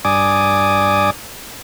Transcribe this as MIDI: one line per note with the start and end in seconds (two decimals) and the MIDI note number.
0.05 1.10 43
0.05 1.10 74
0.05 1.10 80
0.05 1.10 86
0.05 1.10 87